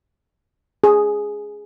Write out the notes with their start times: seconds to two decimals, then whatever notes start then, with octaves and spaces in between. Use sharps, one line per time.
0.84 G#4